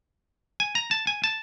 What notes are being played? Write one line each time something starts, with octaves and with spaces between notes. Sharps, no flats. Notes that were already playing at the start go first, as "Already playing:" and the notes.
G#5
A#5
A5
G#5
A5